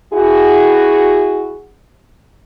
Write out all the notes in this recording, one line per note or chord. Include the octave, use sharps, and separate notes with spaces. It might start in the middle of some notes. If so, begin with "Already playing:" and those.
E4 F#4 G#4